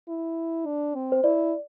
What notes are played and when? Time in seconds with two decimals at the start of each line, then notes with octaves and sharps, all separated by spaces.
0.08 E4
0.66 D4
0.95 C4
1.12 C5
1.24 E4 D5